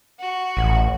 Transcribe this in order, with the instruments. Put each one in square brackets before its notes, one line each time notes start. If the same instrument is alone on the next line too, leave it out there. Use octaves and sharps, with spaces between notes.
[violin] F#4
[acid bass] A1